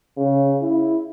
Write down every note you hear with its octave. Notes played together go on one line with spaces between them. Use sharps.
C#3
E4